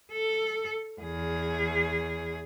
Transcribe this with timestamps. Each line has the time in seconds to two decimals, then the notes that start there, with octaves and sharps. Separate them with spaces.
0.12 A4
1.00 E2 G#4